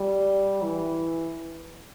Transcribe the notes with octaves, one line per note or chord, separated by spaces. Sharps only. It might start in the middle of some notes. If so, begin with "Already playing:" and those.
Already playing: G3
E3